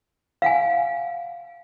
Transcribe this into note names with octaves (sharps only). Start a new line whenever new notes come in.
F5 F#5 G#5